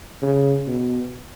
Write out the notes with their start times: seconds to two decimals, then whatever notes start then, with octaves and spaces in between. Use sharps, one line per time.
0.22 C#3
0.67 B2